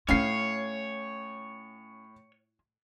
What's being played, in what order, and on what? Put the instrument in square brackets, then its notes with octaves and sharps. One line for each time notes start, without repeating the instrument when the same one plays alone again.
[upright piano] A2 C7 [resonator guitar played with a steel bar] C#4 F5 [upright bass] E4 F4 [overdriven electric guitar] C#5